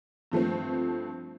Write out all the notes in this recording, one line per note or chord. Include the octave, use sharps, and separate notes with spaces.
G2 F3 A3 C4